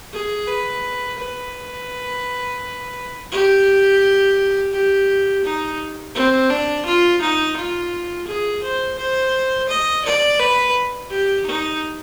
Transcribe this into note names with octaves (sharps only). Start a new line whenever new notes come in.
G#4
B4
B4
G4
G4
D#4
C4
D4
F4
D#4
F4
G#4
C5
C5
D#5
D5
B4
G4
D#4